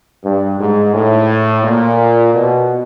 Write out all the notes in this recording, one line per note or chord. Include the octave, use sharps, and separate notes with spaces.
G2
G#2
A2
A#2
B2